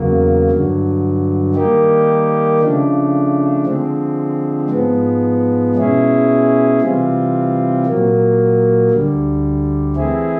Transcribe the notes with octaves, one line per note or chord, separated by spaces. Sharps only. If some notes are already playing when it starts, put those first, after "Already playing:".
Already playing: E2 C#3 F#3 A#3
G2 D3 F#3
D#3 G3 A#3 D#4 G4
C#3 F3 A3 D4
D3 F3 G#3 C4
G#2 F3 G#3 B3
B2 G#3 C#4 E4 G#4
C3 E3 G3 C4 F4
A#2 F#3 A#3
D2 D3 G3
E3 A3 C4 E4 G#4